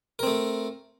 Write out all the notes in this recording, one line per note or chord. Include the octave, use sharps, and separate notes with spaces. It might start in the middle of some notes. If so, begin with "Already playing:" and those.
A3 C4 A#4